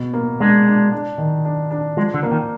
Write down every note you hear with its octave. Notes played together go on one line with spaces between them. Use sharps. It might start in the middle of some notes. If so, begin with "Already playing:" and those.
Already playing: B2
A#3
G#3 D4
D4
D4
D#3
D4
D4
F3 G#3
D3
A#3
D#3